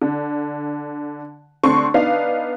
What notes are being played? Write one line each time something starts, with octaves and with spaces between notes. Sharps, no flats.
D3
D3 A3 C4 C6 C#6
B3 D4 D#4 F5